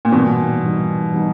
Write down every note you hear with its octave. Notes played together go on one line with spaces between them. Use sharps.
A#2
G#2 B2 E3 G3 B3 D#4
G#2 E3 G3 B3 D#4
E3 G3 B3 D#4